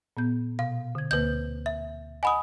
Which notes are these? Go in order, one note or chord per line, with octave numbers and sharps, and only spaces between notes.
A#2 B3 G6
B2 F5
D3 G#6
D2 D3 A#3 B4 G6
E5
D#5 F#5 G#5 B5 D#6